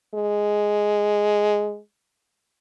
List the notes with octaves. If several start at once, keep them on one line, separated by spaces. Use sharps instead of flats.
G#3